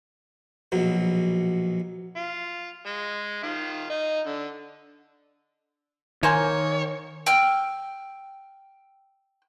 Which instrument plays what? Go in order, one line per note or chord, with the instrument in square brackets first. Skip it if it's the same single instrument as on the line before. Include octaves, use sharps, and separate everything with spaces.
[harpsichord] A#1 B2 F#3
[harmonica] F4
G#3
D#3 F4
D#4
D3
[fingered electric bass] D#3 [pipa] A#3 C5 G#5 [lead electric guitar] C#5
[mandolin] G5 E6 F6